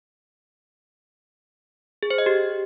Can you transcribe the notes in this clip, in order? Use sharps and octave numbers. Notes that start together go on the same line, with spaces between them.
G#4
C5
D#5
G4